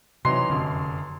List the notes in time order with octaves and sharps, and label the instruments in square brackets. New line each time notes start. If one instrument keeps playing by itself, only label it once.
[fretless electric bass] C3 [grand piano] E3 F#3 D#4 [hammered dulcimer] C6
[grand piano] F1 F#2 [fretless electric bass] D3